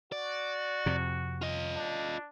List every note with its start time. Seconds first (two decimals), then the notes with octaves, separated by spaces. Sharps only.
0.12 F#4 D5
0.86 F2 C3
1.42 F4 D#5
1.75 D4